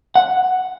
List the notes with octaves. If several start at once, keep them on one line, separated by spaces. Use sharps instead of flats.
F#5